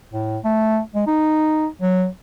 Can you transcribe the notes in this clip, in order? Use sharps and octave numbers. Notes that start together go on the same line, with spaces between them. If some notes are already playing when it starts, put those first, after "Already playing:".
A2
A3
G#3
D#4
F#3